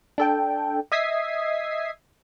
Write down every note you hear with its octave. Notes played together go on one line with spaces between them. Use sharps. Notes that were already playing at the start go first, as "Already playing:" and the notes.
D4 A4 G5
D#5 E5 D#6 G#6 B6 C7